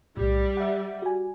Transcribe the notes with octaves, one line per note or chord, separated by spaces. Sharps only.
B1 A2 G3
E5 F#5
F#4 G#5